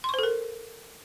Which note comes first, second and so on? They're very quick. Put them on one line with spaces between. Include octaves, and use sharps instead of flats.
C6 C#6 C5 A4 A#4